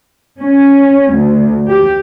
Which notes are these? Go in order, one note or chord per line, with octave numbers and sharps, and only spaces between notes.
C#4
D2
G4